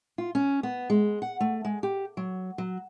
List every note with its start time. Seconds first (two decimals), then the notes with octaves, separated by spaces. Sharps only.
0.18 F4
0.35 C#4
0.63 B3
0.90 G#3
1.22 F#5
1.40 A3
1.65 G#3
1.83 G4
2.17 F#3
2.58 F#3